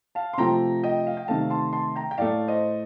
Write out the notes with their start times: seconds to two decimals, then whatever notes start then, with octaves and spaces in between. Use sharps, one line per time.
0.15 F5 A5
0.33 C6
0.38 C3 F3 A3 G5 A#5
0.83 D#5 G5
1.07 F5
1.17 G5
1.28 C3 D#3 A3 F5 A5
1.50 A5 C6
1.73 A5 C6
1.96 G5 A#5
2.11 G5
2.18 A2 A3 D5 F5
2.48 C5 D#5